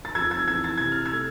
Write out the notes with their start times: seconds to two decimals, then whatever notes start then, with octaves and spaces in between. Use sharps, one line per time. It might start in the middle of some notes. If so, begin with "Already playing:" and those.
0.05 A6
0.15 F2 E6 G#6
0.31 E6 G#6
0.47 E3 E6 G#6
0.64 A6
0.78 C3 G#6
0.92 F6
1.05 E6 G#6
1.12 A3